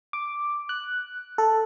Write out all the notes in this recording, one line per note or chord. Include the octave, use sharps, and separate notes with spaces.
D6
F#6
A4